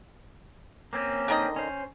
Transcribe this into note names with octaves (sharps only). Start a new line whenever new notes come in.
A#3 C4 C#4
D3 D#3 D#5
C#4 C5